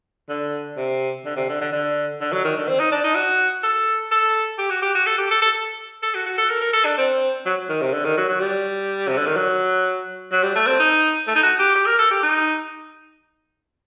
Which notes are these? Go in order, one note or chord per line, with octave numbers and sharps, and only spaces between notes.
D3
C3
D3
C3
D3
D3
D3
D3
F#3
D#3
D3
C4
D#4
D4
D#4
F#4
A4
A4
G4
F#4
G4
F#4
A4
G4
A4
A4
A4
F#4
F#4
A4
A#4
A#4
A4
D4
C4
F#3
D#3
C3
D3
D#3
F#3
F#3
G3
C3
D3
D#3
F#3
F#3
G3
A3
C4
D#4
A3
D#4
F#4
G4
G4
A#4
A4
G4
D#4